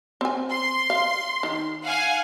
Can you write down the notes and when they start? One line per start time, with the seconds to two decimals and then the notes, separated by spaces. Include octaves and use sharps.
0.21 C4 G#5
0.50 C6
0.90 F5
1.43 D#3
1.85 F5 F#5 G#5